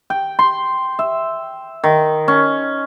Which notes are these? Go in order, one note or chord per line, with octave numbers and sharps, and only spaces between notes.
G5
C6
E5
D#3
C#4